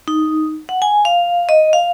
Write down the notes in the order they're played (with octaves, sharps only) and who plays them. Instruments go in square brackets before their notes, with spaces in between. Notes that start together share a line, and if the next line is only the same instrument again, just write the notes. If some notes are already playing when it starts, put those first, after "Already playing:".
[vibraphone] D#4
F#5
G#5
F5
D#5
F5